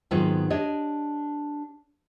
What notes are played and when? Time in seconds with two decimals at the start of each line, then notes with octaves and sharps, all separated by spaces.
0.11 G#2 D#3 F#3 B3 C4 F4
0.50 D4 G4 C#5 D#5